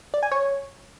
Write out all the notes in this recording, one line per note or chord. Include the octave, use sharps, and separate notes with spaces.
D5
G#5
C#5